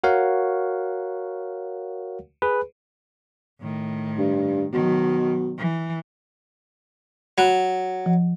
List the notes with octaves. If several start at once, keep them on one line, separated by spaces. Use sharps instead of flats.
F#4 A#4 C#5 F5 F#5
G#4 B4
A2 D#3
G2
B2 D#3 F#3
E3
F#3 B5 F#6
F3 F#5